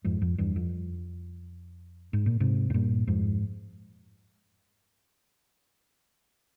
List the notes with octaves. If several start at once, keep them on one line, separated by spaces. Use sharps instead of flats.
F2 G#2
F2
E2 G2
F2
G#2
A#2
G#2 C3
G#2
G2 A#2
F2 G#2